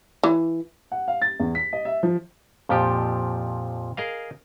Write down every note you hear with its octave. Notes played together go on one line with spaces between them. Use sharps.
E3
F#5
F5
A6
E2
B6
D#5
E5
F3
F2 A#2 F3 G4
G#4 A#4 D#5 F5